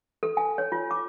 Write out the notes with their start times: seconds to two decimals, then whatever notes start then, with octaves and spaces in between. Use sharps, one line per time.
0.23 A4
0.37 G#5
0.58 C#5
0.72 F4
0.91 D6